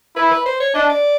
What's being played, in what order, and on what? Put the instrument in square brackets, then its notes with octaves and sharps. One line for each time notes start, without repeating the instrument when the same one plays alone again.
[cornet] E4 [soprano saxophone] B4
[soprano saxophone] B4
C5
C#5
[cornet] D4 [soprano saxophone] D#5
[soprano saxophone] D5